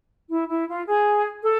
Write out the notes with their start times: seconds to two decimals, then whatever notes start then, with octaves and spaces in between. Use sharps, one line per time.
0.31 E4
0.51 E4
0.69 F4
0.88 G#4
1.44 A4